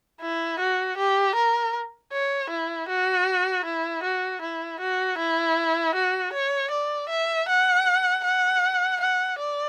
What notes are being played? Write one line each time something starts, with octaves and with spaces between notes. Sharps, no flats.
E4
F#4
G4
A#4
C#5
E4
F#4
E4
F#4
E4
F#4
E4
F#4
C#5
D5
E5
F#5
F#5
F#5
D5